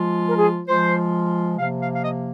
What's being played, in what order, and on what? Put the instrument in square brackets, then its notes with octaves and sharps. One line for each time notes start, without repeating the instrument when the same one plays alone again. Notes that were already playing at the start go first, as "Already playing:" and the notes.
Already playing: [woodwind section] F3 G#3 F4
A#4
G#4
F3 G#3 F4 C5
C3 F3 A#3 F5
F5
F5
D#5